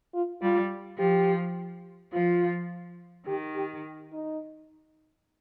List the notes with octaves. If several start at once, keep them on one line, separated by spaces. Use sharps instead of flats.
F4
G3 F4
F3 G4
F3 F4
D#3 G4
G4
D#4